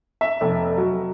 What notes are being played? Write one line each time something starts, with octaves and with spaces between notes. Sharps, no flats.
E5
F1
F#3